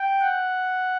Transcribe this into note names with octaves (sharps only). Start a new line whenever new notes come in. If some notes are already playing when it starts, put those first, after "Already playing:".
Already playing: G5
F#5